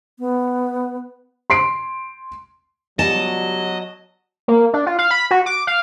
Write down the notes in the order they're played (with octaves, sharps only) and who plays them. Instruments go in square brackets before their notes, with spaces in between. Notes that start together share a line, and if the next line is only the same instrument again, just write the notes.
[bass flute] B3
[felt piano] C6 C7 D7
[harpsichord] C#2 B2 G3 [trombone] F#3 [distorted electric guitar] D#5 [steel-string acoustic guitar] A5
[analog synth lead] A#3
D4
F4
F5
B5
F#4
D6
F5